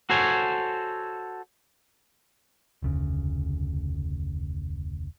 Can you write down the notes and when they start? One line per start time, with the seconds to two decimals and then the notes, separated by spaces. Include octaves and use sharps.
0.10 F#4 A4 C5 C#5 G#5
2.82 F1 D2 C#3